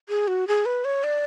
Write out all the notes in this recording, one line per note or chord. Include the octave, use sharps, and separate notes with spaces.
G#4
F#4
G#4
B4
C#5
D5